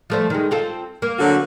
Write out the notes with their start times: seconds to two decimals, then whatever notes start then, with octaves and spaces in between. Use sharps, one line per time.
0.10 F3 A3 C5
0.30 D#3 G#3
0.51 C4 F4 A4
1.02 A#3
1.18 D3 F#3 F#4